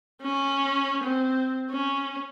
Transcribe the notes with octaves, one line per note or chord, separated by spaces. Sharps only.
C#4
C4
C#4